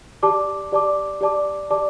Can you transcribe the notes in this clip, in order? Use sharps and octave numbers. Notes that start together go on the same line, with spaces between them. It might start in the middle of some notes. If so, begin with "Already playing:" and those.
G4 D5 A5 D6
G4 D5 A5 D6
G4 D5 A5 D6
G4 D5 A5 D6